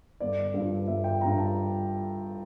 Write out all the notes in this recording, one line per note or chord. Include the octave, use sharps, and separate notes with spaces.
G1 D5
G2 F3
G1 E5
G5
G2 F3 A#5
A5